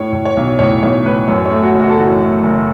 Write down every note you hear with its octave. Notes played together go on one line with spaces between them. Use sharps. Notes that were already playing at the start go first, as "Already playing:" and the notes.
Already playing: A2 C#5
A2
C#5
B1
A2 C#5
B1 C#5
A2 B4
F#2 C#5
C#5
A3
F#4
F#1
F#4
A4
E3 F#4
A3
F#1